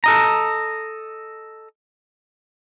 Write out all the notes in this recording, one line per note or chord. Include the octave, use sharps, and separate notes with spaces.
A4 D#5 A#5